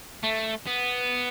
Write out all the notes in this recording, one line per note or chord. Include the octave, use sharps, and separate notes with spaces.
A3
B3